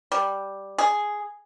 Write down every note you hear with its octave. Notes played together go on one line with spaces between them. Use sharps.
G3
G#4